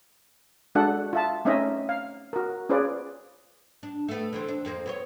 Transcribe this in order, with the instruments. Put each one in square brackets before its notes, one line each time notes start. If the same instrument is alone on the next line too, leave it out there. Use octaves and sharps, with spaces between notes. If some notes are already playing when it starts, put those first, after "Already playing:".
[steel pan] G#3 D4 F#4 A4 F#5
F4 E5 A5
A3 C4 C#4 D#4 D#5 E5
F5
F#4 A#4
C#4 F4 G#4 B4 C5 D5
[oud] D4
A3 B3
D3 E3 C4
D4
F2 A#3 C4
B3 C4 C#5